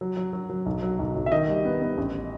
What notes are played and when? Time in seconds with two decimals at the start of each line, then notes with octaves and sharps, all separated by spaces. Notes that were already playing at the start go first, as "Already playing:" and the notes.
0.01 F#3
0.17 F#3
0.33 F#3
0.50 F#3
0.66 B1
0.83 F#3
0.99 B1
1.16 B1
1.26 E5
1.32 D#3 D#5
1.48 G3
1.65 B3
1.82 B3
1.98 A1